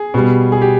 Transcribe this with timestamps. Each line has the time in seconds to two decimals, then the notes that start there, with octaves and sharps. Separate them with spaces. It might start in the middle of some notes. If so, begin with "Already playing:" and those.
Already playing: G#4
0.14 B2 G3
0.52 G#4
0.62 G4